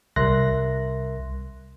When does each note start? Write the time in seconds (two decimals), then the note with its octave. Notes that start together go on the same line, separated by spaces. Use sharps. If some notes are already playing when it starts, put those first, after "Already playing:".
0.16 C2 A#4 E5 C6 F#6 A#6